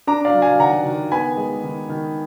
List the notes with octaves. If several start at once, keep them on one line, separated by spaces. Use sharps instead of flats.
D4 A#5 D6
D5 F5
F#3
F5 G#5
D#3 F#5 A#5
D#3
B3 G#5 B5
G#3
D#3
D#3